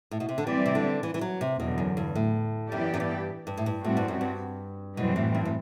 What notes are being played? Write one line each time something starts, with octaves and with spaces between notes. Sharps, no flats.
A2
B2
C3
D3
E3 G3 C4 G4 D5
C3
D3
E3
E3
F#3
C3
E2 B2 D3 F#3
F#2
G2
A2
F#2 E3 B3 E4 G4 D5
F#2
G2
G2
A2
G2
A2 G3 C4 F#4
G2
F#2
G2
F#2 B2 E3 G3 C4
A2
G2
A2